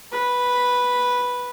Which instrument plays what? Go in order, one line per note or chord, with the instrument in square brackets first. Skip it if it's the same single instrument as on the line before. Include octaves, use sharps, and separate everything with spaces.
[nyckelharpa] B4